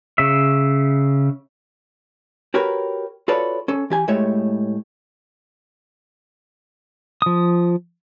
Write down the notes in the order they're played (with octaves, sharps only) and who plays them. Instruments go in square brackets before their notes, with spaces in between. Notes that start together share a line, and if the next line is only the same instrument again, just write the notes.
[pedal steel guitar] C#3 E5
[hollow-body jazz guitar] F#4 G4 A#4 B4 C#5
F4 F#4 A4 B4 C#5 D5
C#4 A4
E3 G4 G#5
A2 G#3 A3 G4 C#5 E5
[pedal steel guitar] F3 D#6